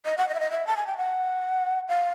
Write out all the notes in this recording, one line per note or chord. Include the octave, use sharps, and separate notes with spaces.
D#5
F#5
D#5
E5
D#5
E5
A5
G#5
G5
F#5
F5